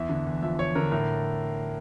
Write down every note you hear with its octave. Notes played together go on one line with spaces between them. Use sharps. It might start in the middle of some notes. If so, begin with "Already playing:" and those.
Already playing: E2 E3 E5
D3
E2
F3 E5
E2 C#5
D3 A#4
A2 A#4